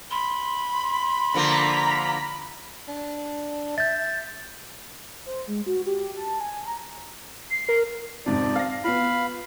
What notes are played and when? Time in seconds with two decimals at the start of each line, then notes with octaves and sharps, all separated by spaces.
0.11 B5 C6
1.34 D3 F3 A#3 A#5 B6
2.89 D4
3.78 E5 G6 A6
5.26 C5
5.48 G#3
5.66 F#4
5.86 G4
5.98 G4
6.17 A5
6.40 G#5
6.66 A#5
7.51 C7
7.69 A#4
8.26 F2 G#2 C3 D5
8.55 F5 A#6
8.84 B3 F4 F5 B5